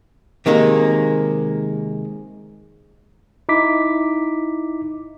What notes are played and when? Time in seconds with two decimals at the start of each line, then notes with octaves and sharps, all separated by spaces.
0.46 C3 D#3 G#3 A#3
3.49 D#4 E4 D6 B6